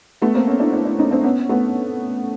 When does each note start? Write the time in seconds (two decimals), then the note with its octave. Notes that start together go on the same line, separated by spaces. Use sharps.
0.22 A3 B3
0.35 A#3 C4
0.48 B3 C#4
0.60 D4 E4
0.72 D4 E4
0.85 D4 E4
0.99 C#4 D#4
1.11 C4 D4
1.24 B3 C#4
1.49 A3 B3